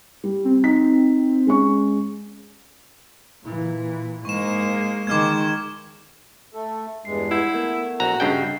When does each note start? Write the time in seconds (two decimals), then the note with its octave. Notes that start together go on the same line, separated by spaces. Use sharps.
0.24 G3
0.45 C4
0.64 D#4 B6
1.47 G#3 C#4 C#6
3.44 A#2 E3
4.25 G#2 G#3 A#3 C#6 E7
5.07 D#3 G#3 D6 F6 G#6
6.54 A3 A4
7.05 E2 G2 G#3 C7
7.31 E4 F#5 G6 G#6
7.53 A3 B3 A#4 F#5
8.00 A#1 F#4 A#5
8.20 G2 C#3 D#5 G5 C7